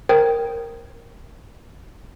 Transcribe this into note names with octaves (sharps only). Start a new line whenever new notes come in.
A#4 C5 G5 D#6 G#6